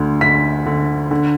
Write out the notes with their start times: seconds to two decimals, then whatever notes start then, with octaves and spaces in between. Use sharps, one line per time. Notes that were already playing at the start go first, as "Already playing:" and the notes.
Already playing: D2 D3
0.21 D3 B6
0.66 D3
1.11 D3